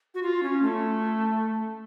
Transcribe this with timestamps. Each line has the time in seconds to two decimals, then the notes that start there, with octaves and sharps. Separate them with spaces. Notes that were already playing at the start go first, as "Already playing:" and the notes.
0.14 F#4
0.23 F4
0.43 C#4
0.63 A3